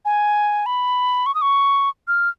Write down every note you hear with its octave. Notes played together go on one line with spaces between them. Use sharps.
G#5
B5
C#6
D#6
C#6
F6